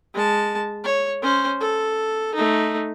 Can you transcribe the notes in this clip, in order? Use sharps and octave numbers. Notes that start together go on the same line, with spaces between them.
G#3 A5
C#5
C#4 C5
A4
A3 D#4